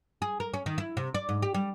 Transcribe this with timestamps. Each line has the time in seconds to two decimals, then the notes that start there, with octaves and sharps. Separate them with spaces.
0.22 G#4
0.40 A#4
0.54 C#4
0.66 D#3
0.78 E4
0.97 C3
1.14 D5
1.29 G#2
1.42 G4
1.54 G3